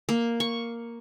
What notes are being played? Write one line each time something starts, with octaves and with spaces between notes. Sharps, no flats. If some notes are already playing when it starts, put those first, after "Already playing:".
A#3
C#6